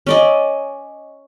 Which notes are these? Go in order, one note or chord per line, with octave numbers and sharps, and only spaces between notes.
C#4 D5 D#5